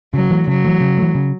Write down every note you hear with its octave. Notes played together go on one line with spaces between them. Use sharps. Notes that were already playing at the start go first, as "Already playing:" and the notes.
C#3 F#3
E3 A3
C#3 F#3
E3 A3
C#3
E3 A3
C#3